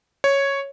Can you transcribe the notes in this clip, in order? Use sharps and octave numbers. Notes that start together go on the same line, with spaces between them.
C#5